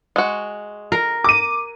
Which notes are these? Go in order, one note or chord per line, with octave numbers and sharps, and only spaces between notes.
G#3 F#4
A#4
D6 D#7